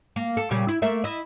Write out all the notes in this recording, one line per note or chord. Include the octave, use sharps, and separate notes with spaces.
A#3
A4
A#2 C#3 G3
E4
A3 A#3 E5
E4 D#5